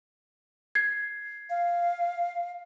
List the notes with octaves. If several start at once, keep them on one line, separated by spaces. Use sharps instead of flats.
G#6 C7
F5